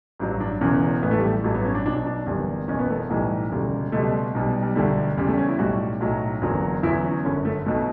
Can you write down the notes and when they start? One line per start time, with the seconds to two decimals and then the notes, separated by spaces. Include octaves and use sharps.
0.19 A1 G2 F#3
0.41 D4
0.61 E1 E2 C#3 E3 C#4
1.02 A1 A2 E3 B3
1.11 A3
1.18 G3
1.26 A3
1.44 A1 G2 F#3 A3
1.54 B3
1.65 C#4
1.75 D4
1.85 B1 B2 F#3 D4
2.06 D4
2.26 F#1 E2 D3 G3
2.68 F#1 E2 B2 C#4
2.79 B3
2.90 A3
3.10 B1 A2 E3 G3
3.51 E1 D2 C#3 G3
3.92 C#2 B2 G3 A3
4.34 B1 B2 G3
4.63 G3
4.75 E1 D2 D3 G3 A3
5.17 E2 C#3 G3
5.28 A3
5.38 C#4
5.49 E4
5.59 B1 A2 G3 F#4
6.01 B1 A2 F#3
6.42 F#1 E2 D3 F#3
6.83 E2 D3 F#3 E4
7.04 C#4
7.25 G1 F#2 D3 C#4
7.45 A3
7.66 B1 B2 F#3 A3